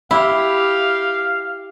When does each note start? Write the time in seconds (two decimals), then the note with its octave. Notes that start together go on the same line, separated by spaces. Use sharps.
0.11 E4 G4 F5